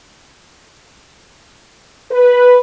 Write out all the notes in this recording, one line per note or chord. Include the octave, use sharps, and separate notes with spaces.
B4